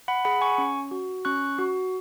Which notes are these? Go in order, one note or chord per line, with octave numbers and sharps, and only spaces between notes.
F#5 B5
G#4 F#5 B5
G#5 C#6
C#4
F#4
C#4 C#6 F#6
F#4